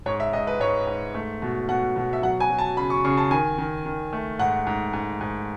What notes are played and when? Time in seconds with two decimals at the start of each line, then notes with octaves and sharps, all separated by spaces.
0.06 G#2 C#5
0.20 E5
0.33 G#2 D#5
0.47 B4
0.60 G#2 C#5
0.87 G#2
1.15 A3
1.42 B2
1.68 B2 F#5
1.96 B2
2.13 E5
2.22 F#3 F#5
2.40 G#5
2.50 F#3
2.58 A5
2.77 C#3 B5
2.90 C#6
3.04 C#3 C#6
3.17 A5
3.31 D#3 G#5
3.58 D#3
3.86 D#3
4.13 A3
4.39 G#2 F#5
4.67 G#2
4.93 G#2
5.21 G#2